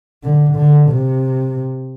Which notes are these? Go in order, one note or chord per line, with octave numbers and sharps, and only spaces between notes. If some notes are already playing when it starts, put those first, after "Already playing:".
D3
D3
C3